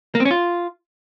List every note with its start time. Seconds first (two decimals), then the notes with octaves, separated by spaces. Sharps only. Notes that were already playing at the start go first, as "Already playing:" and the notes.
0.15 A#3
0.20 C4
0.25 C#4
0.31 F4